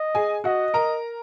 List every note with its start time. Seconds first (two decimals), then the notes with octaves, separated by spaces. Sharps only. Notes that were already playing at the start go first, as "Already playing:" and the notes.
Already playing: D#5
0.15 G#4 G#5
0.44 F#4 D#5 F#5
0.74 A#4 A#5